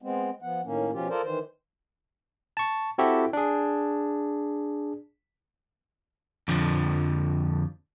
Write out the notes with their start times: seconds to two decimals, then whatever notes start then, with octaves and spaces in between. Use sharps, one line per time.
0.02 G#3 B3 C4
0.42 F3 B3 F#5
0.64 A2 D#3 A#3 C#4
0.92 B2 F3 C#4 F4 G4
1.09 F4 A4 A#4 C5 D5
1.24 D#3 E3 C5
2.57 A5 C#6
2.98 C4 E4 F#4 G4 A4
3.33 D4 G#4
6.48 F2 D3 F3